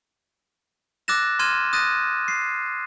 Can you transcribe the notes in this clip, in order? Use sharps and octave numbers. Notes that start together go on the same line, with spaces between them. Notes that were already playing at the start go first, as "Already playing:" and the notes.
D6 E6 F#6 A6 A#6 E7
C6 F6 G#6 D#7 E7
D#6 F#6 A6 A#6 D#7
C7